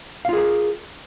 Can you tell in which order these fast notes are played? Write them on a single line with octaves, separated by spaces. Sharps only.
F5 F4 G#4 A#4